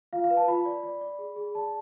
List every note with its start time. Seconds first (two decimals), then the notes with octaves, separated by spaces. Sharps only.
0.13 F4 F5
0.24 F5
0.30 B4
0.37 A5
0.48 F4 B5
0.65 D5
0.83 D5
1.01 D5
1.19 G#4
1.36 G#4
1.55 D5 A5